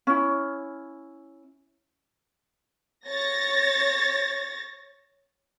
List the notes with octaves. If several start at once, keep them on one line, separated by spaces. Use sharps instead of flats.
C#4 E4
C#5 A6 A#6